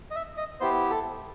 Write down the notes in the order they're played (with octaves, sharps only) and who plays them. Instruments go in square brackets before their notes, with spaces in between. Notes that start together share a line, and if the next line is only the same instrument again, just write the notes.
[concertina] D#5
E5
D#5
B3 E4 G4 C5
A4